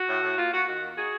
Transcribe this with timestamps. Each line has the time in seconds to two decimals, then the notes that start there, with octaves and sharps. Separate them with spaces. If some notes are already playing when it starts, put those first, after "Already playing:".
Already playing: F#4
0.08 A2
0.23 A2
0.37 A#3 F4
0.52 A#3 F#4
0.67 D#3 F#4
0.82 A#3
0.96 D#4 F#4 G#4